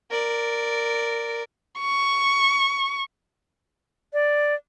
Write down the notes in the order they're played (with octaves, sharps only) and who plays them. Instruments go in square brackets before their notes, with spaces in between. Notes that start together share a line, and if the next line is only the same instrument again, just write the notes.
[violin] A#4 D5
C#6
[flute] D5